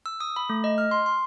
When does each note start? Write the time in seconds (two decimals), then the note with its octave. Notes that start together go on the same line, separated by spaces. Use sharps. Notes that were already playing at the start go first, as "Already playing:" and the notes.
0.06 E6
0.20 D#6
0.36 B5
0.50 A3
0.64 D#5
0.78 F6
0.91 C6
1.06 C6